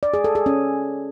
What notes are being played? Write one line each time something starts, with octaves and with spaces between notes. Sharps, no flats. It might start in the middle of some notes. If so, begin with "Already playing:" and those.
D5
G#4
A4
G#4
C#4